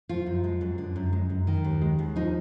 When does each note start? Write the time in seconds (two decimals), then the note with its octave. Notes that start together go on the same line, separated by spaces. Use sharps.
0.09 F3 F4
0.26 F#2
0.44 G#3
0.61 F#2
0.78 D3
0.96 F#2
1.13 G#3
1.29 F#2
1.47 D#3
1.64 D#2
1.82 G#3
1.99 D#2
2.16 F3 D#4